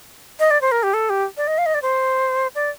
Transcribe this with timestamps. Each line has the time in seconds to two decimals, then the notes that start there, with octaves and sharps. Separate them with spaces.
0.39 D#5
0.51 D5
0.61 C5
0.71 A#4
0.83 G4
0.93 A4
1.09 G4
1.37 D5
1.47 D#5
1.58 F5
1.66 D#5
1.74 D5
1.82 C5
2.55 D5